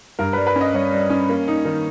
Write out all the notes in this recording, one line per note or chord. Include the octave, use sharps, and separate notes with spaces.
G2 A#4
G3 B4
B4
C#4
D#5
G3 C#5
G3
C#4
A#3
D#4
D#3